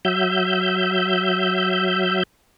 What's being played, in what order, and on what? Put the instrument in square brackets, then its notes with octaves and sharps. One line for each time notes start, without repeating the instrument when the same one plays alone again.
[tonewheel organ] F#3 E5 G6